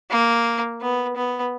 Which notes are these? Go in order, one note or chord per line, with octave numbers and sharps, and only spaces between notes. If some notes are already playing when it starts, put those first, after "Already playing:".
A#3
B3
B3